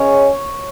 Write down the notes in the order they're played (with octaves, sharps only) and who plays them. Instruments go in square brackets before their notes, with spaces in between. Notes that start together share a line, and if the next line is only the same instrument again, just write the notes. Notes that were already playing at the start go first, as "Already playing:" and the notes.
Already playing: [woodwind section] C#3 G#3 C#4 [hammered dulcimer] C#5